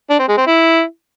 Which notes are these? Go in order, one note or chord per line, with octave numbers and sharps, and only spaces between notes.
D4
C4
G#3
C4
E4